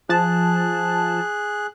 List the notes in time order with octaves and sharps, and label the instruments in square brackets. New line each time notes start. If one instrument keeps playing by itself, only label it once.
[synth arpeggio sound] F3 A5 [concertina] G#4 F#6